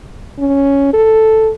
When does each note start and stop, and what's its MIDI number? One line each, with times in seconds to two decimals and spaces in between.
0.39 0.90 61
0.93 1.52 69